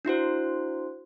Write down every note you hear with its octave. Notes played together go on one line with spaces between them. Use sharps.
D4 E4 F#4 C5